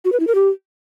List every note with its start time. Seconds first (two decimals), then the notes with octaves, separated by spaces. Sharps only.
0.05 F#4
0.12 B4
0.20 E4
0.27 A#4
0.35 G4